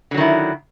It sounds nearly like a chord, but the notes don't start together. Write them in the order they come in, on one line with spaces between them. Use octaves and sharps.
D3 F#3 D#3 E4